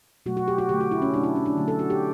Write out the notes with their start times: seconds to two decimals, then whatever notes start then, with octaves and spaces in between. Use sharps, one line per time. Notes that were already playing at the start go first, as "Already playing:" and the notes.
0.26 B2 F#3 A3 F#4
0.37 F#4
0.48 G4
0.58 F#4
0.69 D3 A3 G4
0.80 F#4
0.91 E4
1.02 C#4
1.14 B2 F#3 A3 D4
1.24 E4
1.36 C#4
1.46 D4
1.57 D3 F#3 A3
1.68 A4
1.79 F#4
1.90 G4